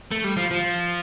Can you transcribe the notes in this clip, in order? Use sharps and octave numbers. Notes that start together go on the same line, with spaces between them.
A3
G3
F3
F3